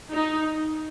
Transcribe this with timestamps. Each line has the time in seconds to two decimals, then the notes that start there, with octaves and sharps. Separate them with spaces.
0.12 D#4